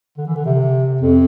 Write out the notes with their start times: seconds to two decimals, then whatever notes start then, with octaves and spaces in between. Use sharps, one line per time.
0.17 D3
0.27 E3
0.35 D3
0.46 C3
1.01 F2